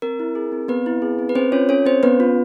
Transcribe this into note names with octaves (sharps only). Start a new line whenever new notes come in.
C4 A#4
E4
G#4
C4
B3 C4 B4
E4
G#4
C4
B4
C4 C#4 C5
C#4 F4 C#5
C#4 A4 C#5
C4 C#4 C5
B3 C#4 B4
F4